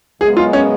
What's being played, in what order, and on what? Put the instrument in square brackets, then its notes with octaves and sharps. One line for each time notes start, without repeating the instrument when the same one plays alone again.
[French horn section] F#2 C#3 G#3 B3 [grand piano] G#4
[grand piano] F4
C#4